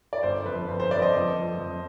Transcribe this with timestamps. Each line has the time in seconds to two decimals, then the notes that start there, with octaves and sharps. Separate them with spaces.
0.13 D5
0.23 G1 C5
0.45 F2 B4
0.68 G1 C5
0.80 C5
0.91 F2 B4 D5
1.02 C5 D#5
1.14 F2
1.37 F2
1.59 F2